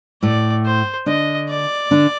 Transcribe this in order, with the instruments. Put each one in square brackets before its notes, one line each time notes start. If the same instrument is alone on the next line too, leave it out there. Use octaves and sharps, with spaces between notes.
[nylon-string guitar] A2 A3 [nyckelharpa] D5
[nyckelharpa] C5
[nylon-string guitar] D3 D4 [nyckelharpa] D#5
[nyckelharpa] D5
[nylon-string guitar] D3 D4